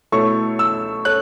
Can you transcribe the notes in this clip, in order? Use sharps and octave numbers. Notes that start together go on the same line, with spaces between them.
B2 A3 E4 A4 C#5 C#6
E6
A4 C#5 F#6